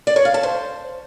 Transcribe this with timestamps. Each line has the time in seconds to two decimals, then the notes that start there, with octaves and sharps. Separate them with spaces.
0.07 D5
0.16 C#5
0.25 F5
0.34 A5
0.43 C5